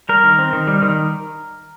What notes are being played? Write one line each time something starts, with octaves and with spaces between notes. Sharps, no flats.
G3 A#4
D#3
C4
D#3
G3
D#3